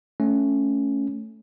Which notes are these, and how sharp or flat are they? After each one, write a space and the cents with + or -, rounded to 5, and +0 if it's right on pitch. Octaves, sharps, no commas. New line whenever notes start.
A3 +0 C#4 +0